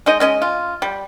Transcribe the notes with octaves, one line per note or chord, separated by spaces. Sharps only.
G#3 D#4 D#5
G#3 C#4 D#5
F4
G3